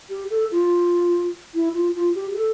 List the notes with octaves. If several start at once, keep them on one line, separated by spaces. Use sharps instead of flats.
G4
A4
F4
E4
F4
F4
G4
G4
A4